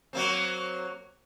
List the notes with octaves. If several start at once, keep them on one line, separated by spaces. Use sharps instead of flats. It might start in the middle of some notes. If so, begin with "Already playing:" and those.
F#3 A#3 C4